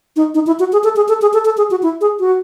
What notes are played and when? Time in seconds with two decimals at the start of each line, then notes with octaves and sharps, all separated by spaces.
0.16 D#4
0.34 D#4
0.47 E4
0.59 F#4
0.72 G#4
0.84 A4
0.96 G#4
1.08 A4
1.22 G#4
1.33 A4
1.45 A4
1.57 G#4
1.71 F#4
1.83 E4
2.01 G#4
2.20 F#4